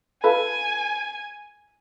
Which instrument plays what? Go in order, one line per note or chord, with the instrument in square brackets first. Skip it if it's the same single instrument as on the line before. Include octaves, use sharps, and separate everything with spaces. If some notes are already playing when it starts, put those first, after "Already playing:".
[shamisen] F4 A4 B4 [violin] G#5